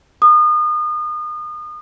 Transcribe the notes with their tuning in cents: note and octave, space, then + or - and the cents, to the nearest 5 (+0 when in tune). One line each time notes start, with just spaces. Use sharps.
D#6 -35